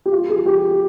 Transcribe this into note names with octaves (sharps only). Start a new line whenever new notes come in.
G4
F4
G#4
G4